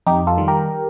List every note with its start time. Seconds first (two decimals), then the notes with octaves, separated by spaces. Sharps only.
0.06 F2 D#4 G4
0.27 F4 A4
0.38 D#3 G3
0.48 G4 A#4